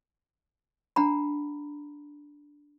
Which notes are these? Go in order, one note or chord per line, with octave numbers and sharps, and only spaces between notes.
D4 F#5 A#5 B5